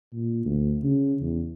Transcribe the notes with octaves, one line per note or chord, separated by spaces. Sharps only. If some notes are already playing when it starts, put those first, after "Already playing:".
A#2
D2
C#3
E2